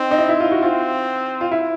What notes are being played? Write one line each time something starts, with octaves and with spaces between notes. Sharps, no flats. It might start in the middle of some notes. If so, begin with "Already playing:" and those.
Already playing: C4 D#4
D#4
E4
E4
F4
F#4
C4 F4
F4
E4